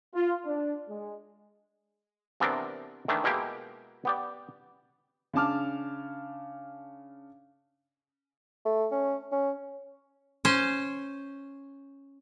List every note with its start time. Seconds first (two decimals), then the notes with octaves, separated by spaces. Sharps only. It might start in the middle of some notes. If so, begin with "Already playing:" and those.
0.15 F4
0.46 D4
0.89 G#3
2.40 C3 E3 B3 C4 D4 A#4
3.08 D#3 E3 A3 D4
3.24 B2 G#3 A#3 E4 G4
4.05 B3 G4 D5
5.33 C#3 D4 A5 D6 F6
8.66 A3
8.92 C#4
9.32 C#4
10.45 C#4 C5